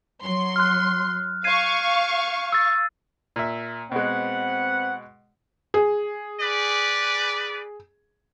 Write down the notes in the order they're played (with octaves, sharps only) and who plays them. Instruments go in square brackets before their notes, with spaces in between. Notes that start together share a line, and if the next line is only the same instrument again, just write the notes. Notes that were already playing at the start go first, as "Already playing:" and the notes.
[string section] F#3 C6
[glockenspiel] F6 F#6
[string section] F5 C#6 [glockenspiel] G#6 C7 D#7
[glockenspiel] E6 A6
[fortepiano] A#2 E5
[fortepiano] B2 G#3 [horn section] C4 B4 F#5
[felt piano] G#4
[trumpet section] G4 B4 D5